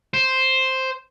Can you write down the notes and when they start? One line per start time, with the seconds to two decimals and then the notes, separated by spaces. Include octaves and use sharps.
0.14 C5